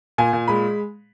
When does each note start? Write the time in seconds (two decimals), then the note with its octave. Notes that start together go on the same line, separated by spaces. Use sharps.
0.18 A#2 G#5
0.33 A#2
0.48 G#3 B5